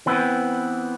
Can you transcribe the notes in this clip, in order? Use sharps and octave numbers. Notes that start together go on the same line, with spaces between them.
E3 B3 C4